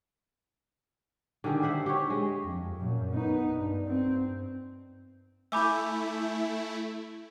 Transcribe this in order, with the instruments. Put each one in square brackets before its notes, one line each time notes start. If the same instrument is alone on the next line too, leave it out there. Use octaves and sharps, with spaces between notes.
[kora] D3 D#3 G4 G#4
C5 E5 F#5
G4 C#5
G#3
[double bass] F2
F#2 A#2
B3 D#4
G2
C4
[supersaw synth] A3 E4 [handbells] E5 G#5 G6 [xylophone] B5 D6 E6